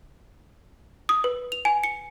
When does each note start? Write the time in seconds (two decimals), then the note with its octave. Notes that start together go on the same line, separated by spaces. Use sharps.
1.09 D#6
1.24 B4
1.52 F7
1.65 G#5
1.84 C#7